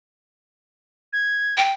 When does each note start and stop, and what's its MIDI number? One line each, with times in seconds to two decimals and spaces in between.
1.13 1.55 92
1.57 1.73 79